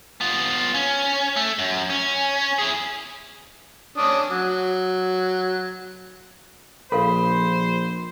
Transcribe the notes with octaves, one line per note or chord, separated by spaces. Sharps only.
B3 F4
C#4
A3
F#2
C#4
E4 G#4
C#4 D4 D#6
F#3
A#1 A4 A#4 C5 F5 B5